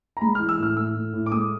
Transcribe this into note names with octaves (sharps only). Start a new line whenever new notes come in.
A#5
G#3 B5
F6
E3
E6
A2 F6
A2 E6
A2
A2
D6
G#3 D#6